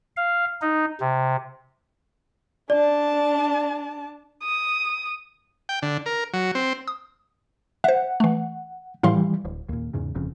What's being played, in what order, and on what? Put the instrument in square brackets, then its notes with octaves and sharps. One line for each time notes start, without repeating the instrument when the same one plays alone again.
[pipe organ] F5
D#4
C3
[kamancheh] D4 A5 [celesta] D5
[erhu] D#6
[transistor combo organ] G5
D3
A#4
F#3
C4
[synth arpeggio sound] D#6
[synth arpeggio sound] C5 E5 [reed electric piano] F#5
[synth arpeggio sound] E3 A3
[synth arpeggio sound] A2 F5 C6 [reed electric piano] E3 G3
[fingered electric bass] D1
D#2 A#2
E2 G#2 C#3
G1 F2 C#3